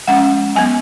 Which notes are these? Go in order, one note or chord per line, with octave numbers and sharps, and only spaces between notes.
F3 G#3 C#4 F#5
F#3 B3 G#5